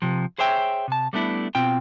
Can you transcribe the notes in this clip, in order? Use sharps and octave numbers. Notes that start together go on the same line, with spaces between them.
C3 F3
G#4 C5 C#5 E5 G5
C3 A5
G3 A3 B3 D4 E4
B2 C4 F4 G5